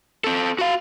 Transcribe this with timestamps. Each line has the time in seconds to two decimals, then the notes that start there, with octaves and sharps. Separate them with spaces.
0.24 C4 A4
0.59 F#4 F5